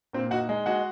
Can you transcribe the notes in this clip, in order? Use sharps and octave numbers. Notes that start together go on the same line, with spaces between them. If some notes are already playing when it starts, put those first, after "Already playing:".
A#2 C4 C5
D#4 F#4 F#5
G#3
G#3 F#4 F#5